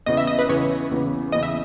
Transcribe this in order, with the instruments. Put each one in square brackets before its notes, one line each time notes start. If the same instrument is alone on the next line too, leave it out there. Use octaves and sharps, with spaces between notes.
[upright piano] E2 C#3 E3 B3 [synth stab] D#5
[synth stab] E5
D#5
B4
[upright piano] E2 C#3 E3 B3 [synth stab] C#5
[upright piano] E2 C#3 E3 B3
[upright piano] E2 C#3 E3 B3 [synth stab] D#5
[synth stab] E5